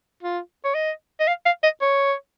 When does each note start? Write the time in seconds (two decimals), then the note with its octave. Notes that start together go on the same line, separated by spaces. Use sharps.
0.23 F4
0.65 C#5
0.75 D#5
1.20 D#5
1.28 F5
1.46 F5
1.63 D#5
1.82 C#5